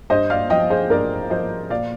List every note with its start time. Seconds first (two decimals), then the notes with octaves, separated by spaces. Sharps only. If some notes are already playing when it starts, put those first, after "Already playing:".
0.10 G2 C5 D#5
0.30 D5 F5
0.50 F3 D#5 G5
0.70 G#4 C5
0.90 G2 A#4 D5
1.30 F3 C5 D#5
1.70 A#2 D5 F5